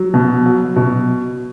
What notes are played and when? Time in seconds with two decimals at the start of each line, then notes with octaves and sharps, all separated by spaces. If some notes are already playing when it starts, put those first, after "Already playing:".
Already playing: F#3
0.14 B2
0.46 F#3
0.76 B2